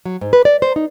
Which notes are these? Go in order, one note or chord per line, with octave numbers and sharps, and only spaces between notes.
F#3
G#2
B4
D5
C5
D#4